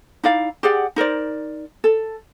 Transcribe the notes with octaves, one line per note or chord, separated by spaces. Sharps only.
D#4 E4 D5 F5
G4 G#4 D5 F#5
D#4 A#4 C5 D5
A4